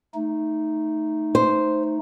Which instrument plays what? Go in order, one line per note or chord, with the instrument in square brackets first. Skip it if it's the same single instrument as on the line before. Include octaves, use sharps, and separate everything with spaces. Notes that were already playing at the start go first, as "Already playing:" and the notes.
[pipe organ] A3 D#4
[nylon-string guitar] C5